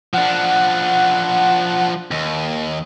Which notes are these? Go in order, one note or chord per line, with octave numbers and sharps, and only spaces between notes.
F3 D4 F#5
D#2